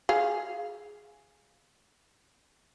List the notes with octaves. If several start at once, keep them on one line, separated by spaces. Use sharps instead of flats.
G#4 F5